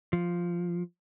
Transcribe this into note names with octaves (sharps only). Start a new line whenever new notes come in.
F3